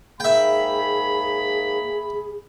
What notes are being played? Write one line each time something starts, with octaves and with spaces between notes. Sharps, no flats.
G#2 A#3 G#4 E5 G5 B5